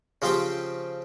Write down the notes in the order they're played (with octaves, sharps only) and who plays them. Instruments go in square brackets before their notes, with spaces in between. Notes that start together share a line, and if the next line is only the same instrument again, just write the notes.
[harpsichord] C#3 F3 C4 G4 C5 G5